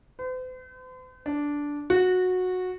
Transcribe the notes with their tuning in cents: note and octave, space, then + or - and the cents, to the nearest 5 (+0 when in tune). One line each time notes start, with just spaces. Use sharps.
C5 -45
D4 -10
F#4 -15